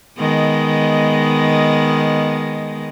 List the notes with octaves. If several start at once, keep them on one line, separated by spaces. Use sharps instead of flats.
D#3 G#3 B3